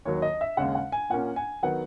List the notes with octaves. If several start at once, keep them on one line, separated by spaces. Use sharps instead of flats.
D#2 D#3 F#3 C#5
D#5
E5
D#2 C#3 G#3 C#4 F#5
F#5
G#5
A#2 A#3 C#4 F#5
G#5
D#3 F#3 B3 F#5